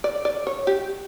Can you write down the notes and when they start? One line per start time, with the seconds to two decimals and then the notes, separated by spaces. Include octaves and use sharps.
0.04 D5
0.25 D5
0.47 C#5
0.67 G4